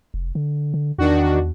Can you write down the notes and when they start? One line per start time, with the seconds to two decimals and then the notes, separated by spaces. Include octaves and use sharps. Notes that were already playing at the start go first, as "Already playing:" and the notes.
0.14 F1
0.35 D3
0.74 D3
0.98 E2 D#3 D4 F#4